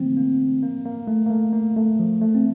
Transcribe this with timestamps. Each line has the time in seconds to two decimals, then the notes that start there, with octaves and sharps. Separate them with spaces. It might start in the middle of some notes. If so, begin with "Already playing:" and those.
Already playing: D3 E3 F3 A3 A#3 C4
0.17 A#3
0.63 A#3
0.85 A#3
1.07 A3
1.26 A#3
1.30 A3
1.53 A#3
1.76 A3
1.99 F3
2.21 A3
2.35 C4